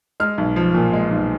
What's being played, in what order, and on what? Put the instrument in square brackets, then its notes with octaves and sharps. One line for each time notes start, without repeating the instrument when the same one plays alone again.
[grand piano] G#3 F6
B1
F3
A#2
G#3
B1